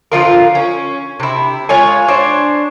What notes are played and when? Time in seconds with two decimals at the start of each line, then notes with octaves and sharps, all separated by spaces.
0.12 D3 F3 F4 A#4
0.55 C#4
1.20 C3 E4
1.69 G#3 F4 C#5 G#5
2.08 D4 C5 C#5